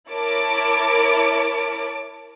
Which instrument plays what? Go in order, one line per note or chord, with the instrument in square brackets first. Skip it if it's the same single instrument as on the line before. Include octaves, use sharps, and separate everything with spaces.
[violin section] E4 A#4 C#5 A5 D6